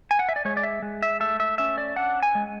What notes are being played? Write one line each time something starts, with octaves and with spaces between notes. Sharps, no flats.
G#5
F#5
E5
D5
G#3 C#5
D5
E5
G#3
E5
A3 E5
E5
C#4 E5
D5
D4 F#5
G#5
G#3